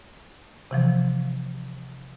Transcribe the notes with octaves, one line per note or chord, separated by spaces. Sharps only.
C3 E3 F3